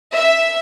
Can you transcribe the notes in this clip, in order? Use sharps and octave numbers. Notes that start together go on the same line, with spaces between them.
E5